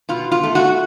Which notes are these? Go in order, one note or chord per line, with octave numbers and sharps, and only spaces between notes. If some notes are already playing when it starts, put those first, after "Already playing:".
B2 F4
F4
A3
F#4